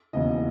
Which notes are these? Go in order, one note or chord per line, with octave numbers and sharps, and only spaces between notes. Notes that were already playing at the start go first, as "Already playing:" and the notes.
E1 D#2 C#3 E3 D#5